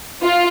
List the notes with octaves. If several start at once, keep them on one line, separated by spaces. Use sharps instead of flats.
F4